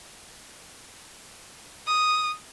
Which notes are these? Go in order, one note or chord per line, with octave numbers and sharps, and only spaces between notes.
D#6